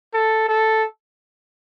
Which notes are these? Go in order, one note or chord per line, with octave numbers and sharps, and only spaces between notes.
A4
A4